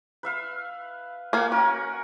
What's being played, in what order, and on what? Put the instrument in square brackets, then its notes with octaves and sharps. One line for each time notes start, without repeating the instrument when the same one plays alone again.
[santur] B4 E5 F5
[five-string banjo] A#3 F5 [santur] F#5 G#5
[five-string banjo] C#4 [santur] F#4 A#4